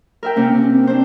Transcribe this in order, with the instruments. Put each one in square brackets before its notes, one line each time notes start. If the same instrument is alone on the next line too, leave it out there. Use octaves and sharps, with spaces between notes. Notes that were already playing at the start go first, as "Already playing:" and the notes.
[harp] A#4 E5 G5
[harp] C3 A#3 [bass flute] C#4
[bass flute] C#4
C4
[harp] D4 C5